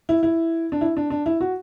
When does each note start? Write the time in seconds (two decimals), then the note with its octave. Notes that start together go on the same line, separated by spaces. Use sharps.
0.09 E4
0.23 E4
0.72 D4
0.81 E4
0.97 D4
1.10 D4
1.26 E4
1.41 F#4